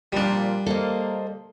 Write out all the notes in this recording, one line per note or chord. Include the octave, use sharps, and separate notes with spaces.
A#2 F3 G3 D4
A#3 A4 C5 D#5